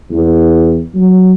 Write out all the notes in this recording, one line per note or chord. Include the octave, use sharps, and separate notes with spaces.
E2
F#3